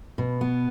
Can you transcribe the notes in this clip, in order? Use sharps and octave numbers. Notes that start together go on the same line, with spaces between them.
B2
B3